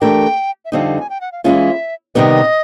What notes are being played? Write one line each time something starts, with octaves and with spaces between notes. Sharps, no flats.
E3 A3 D4 G4 A#4 G5
E5
F2 D3 G3 C4 D#4 F5
G#5
G5
F#5
F5
E3 G#3 C#4 F4 E5
C3 D#3 G3 B3 D#5